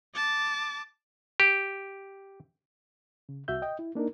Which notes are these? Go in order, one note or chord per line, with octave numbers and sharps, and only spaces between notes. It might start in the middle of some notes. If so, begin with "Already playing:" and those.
A5 D6
G4
C#3
C2 F#4 E5 G6
D#5 G5
E4
A#3 D4 D#4 A#4